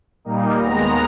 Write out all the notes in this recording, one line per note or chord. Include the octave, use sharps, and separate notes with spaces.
A#2 G3 A#3 D#4
D#2 D#3 G#3 B3 A#5